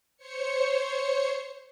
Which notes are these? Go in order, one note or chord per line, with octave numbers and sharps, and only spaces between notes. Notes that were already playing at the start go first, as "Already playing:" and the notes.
C5 C#5 C#7